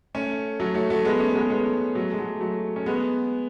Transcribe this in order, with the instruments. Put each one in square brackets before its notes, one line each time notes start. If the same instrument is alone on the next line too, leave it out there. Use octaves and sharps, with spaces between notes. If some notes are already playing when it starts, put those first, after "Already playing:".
[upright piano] A3 C#4
F#3 A3
F#3 A3
F#3 A3
G#3 B3
A3 C#4
G#3 B3
G#3 B3
F#3 A3
G#3
F#3 A3
F#3 A3
C#4
G#3 B3